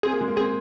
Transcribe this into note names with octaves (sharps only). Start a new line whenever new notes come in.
C4 G#4
A#3
G#3
A#3
C4 G#4